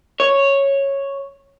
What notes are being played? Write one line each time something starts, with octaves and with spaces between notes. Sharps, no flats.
C#5